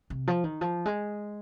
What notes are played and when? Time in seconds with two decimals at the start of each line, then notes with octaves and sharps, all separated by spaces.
0.10 C3
0.27 F3
0.44 D#3
0.61 F3
0.86 G#3